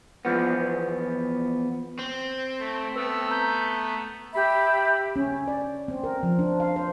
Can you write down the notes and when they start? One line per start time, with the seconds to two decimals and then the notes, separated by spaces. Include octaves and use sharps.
0.25 E2 G2 F3 B3
1.99 C4
2.59 A3
2.96 A3 B3 B4 E6
3.31 A#5 G6
4.33 G4 E5 B5
5.16 C#4
5.48 D5
5.88 C4
6.04 A#4
6.23 F3
6.39 D4
6.60 F5
6.76 C5